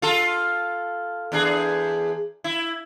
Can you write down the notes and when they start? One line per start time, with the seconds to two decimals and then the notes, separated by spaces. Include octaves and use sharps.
0.02 F4 A4
1.32 E2 D4 G#4
2.44 E4